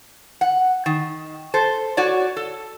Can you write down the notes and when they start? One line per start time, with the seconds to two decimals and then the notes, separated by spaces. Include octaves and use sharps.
0.41 F#5
0.86 D#3
1.54 A4 C5
1.97 F#4 C#5 D5
2.36 A4